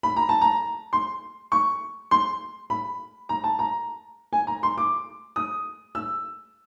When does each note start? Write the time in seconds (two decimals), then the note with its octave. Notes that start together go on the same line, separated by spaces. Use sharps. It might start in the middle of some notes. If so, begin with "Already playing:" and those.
0.03 B5
0.16 A#5
0.29 A5
0.41 A#5
0.93 C6
1.52 C#6
2.11 C6
2.70 B5
3.29 A#5
3.44 A5
3.59 A#5
4.33 G#5
4.47 A#5
4.63 C6
4.78 D6
5.36 D#6
5.95 E6